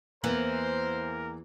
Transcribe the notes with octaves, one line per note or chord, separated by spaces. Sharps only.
E2 E3 A#3 A#4 C5